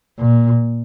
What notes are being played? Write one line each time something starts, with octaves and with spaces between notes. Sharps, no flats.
A#2